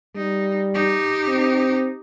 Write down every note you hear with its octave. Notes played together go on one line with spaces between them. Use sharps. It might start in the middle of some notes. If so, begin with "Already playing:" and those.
G3 D#4
D#4 G4
C4